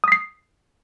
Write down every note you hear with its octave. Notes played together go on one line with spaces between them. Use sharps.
D#6 B6 C7